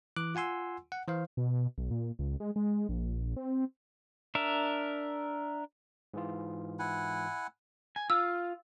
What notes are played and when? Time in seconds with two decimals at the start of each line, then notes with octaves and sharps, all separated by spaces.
0.16 E3 D6 F#6
0.35 F4 F#5 G#5 C6 E6
0.92 F#5
1.07 E3 C5 F5
1.37 B2
1.78 B1
1.91 A#2
2.19 C#2
2.40 G#3
2.56 G#3
2.89 A#1
3.37 C4
4.35 D4 A#4 E5
6.14 G#2 E3 F4
6.79 E4 F#5 G#5
7.96 G#5
8.10 F4 E6